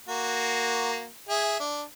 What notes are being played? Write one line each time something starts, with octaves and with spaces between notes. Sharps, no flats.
A#3 F#4
G#4 E5
D4